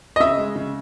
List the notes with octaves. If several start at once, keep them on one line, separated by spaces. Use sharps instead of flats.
D#5
C#3 E5
G#3
C#3